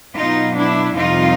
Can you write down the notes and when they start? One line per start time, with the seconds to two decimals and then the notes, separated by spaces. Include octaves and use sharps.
0.16 B2 F#3 B3 D#4 F4
0.57 D4 E4
0.96 F2 C3 D#3 G3 D#4 F4